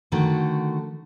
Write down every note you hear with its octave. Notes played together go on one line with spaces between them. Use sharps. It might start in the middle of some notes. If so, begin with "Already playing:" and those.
D3 D#3 A3 F#4